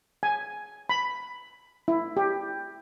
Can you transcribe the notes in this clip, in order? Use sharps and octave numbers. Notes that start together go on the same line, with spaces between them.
G#5
B5
E4
G4